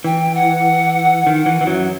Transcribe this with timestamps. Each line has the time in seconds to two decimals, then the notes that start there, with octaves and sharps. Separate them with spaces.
0.04 E3 G5
0.35 F#5
1.27 D#3
1.46 E3
1.61 E3
1.67 F#2 F#3